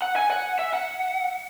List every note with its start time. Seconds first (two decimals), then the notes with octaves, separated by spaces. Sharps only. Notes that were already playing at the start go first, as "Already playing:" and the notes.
0.02 F#5
0.16 G#5
0.30 F#5
0.59 E5
0.74 F#5